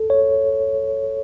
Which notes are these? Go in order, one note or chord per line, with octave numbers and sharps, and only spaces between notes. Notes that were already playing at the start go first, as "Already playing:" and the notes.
Already playing: A4
C#5